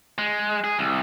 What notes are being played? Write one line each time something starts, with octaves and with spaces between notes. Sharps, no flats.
G#3
G#4
C2